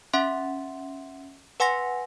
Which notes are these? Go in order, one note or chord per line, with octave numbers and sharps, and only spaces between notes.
C#4 E5 F#5 C6
B4 F#5 G#5 C6 A#6